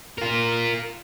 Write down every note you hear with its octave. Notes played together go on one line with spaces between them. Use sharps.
F4 A#4